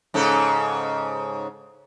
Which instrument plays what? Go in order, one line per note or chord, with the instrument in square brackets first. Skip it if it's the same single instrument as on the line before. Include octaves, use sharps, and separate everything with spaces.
[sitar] G#2 C#3 A4